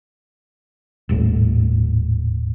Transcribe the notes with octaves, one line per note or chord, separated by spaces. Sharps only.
D#1 G#1 A2